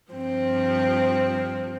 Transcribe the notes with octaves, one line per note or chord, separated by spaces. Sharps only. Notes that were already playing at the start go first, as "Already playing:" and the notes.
G2 F3 C4